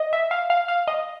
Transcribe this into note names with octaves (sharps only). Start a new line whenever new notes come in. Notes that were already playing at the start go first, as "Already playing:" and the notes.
Already playing: D#5
E5
F5
F5
F5
D#5